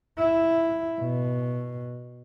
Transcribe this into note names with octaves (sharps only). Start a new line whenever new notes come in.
E4
B2